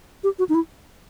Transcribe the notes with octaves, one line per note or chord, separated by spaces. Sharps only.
G4
F#4
D#4
E4